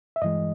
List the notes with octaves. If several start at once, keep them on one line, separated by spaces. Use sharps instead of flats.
E5
G2 E3 G#3 D#5